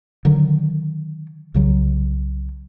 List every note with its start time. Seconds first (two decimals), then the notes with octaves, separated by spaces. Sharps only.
0.25 D3 D#3 F#3
1.54 C2 C#3 F#3